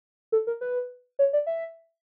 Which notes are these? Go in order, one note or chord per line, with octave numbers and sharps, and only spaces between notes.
A4
A#4
B4
C#5
D5
E5